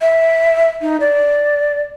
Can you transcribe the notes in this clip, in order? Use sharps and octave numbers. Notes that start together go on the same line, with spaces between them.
E5
D#4
D5